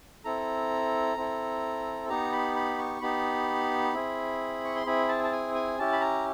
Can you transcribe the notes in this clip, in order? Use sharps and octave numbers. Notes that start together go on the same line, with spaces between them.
C4 E4 A4 A#5
C4 E4 A4
B3 D#4 G4 A#5
B5
B5
C#6
B3 D#4 G4 B5
C4 E4 G#4
C#6
C6
C4 E4 G#4 B5
A5
A5
G#5
G#5
C#4 E4 G4 A5
B5
A#5